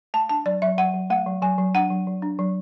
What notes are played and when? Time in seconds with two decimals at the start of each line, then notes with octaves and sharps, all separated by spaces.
0.14 A3 A5
0.30 D4 A5
0.46 F#3 D5
0.62 F#3 E5
0.78 F#3 F#5
0.94 F#3
1.10 A3 F#5
1.26 F#3
1.42 F#3 G#5
1.58 F#3
1.74 D4 F#5
1.90 F#3
2.07 F#3
2.22 D4
2.39 F#3